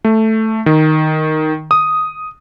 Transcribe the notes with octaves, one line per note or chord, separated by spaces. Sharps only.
A3
D#3
D#6